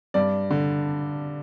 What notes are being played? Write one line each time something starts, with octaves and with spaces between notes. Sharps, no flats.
G2 D5
D3